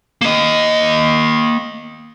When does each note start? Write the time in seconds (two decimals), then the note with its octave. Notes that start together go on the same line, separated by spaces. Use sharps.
0.21 A#3 D#5